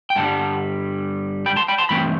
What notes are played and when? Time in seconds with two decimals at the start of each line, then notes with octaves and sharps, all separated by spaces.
0.10 G5
0.16 G2 D3 G3 F#5 A5
1.46 G5 B5
1.56 A5 C6
1.68 G5 B5
1.78 A5 C6
1.89 G2 E3 A3 C4 G5 B5